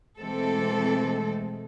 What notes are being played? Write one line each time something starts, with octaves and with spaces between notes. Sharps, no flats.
B2 E3 G#3 A3 C4 A4